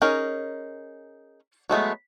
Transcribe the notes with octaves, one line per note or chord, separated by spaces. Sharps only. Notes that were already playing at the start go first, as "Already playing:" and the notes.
C#4 D#4 G#4 A#4
F#3 G#3 A3 B3